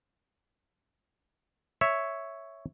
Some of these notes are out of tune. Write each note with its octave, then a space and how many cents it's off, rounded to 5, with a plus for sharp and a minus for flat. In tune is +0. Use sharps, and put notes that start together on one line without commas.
C#5 +0 E5 +0